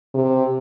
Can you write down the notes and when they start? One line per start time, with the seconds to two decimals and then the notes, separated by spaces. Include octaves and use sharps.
0.14 C3